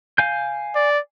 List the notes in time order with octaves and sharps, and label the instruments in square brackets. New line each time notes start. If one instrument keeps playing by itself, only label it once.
[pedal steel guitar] F5 G#5 G6
[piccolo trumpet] D5